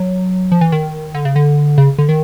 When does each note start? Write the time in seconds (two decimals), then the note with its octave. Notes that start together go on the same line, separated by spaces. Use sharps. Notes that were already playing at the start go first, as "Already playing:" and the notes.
Already playing: F#3
0.52 F3
0.61 E3
0.72 D#3
1.15 D3
1.25 C#3
1.36 D3
1.78 C#3
1.98 D3
2.09 D#3